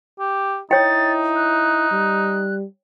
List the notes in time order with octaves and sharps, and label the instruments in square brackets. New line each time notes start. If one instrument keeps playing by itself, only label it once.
[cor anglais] G4
[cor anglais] D#4 [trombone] E4 [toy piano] C#5 G5 [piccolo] A6
[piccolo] F#6
[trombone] G3